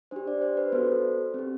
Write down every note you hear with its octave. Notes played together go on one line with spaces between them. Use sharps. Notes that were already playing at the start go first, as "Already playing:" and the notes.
D4 G4 C5
D5
C5
B4
B3 F#4 A4 C5
C4 G4